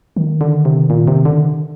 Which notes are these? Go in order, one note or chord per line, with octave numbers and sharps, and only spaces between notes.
D#3
D3
C3
A#2
C3
D3